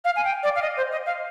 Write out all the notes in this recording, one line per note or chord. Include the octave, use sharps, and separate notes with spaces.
F5
G#5
G5
D5
F5
D#5
C5
D#5
F5